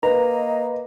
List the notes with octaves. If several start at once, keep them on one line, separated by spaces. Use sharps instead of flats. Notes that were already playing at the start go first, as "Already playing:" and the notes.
A#3 B4 D#5 A#5